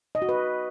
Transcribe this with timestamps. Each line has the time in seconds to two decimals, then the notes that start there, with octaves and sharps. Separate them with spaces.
0.15 D#5
0.22 F#4
0.29 B4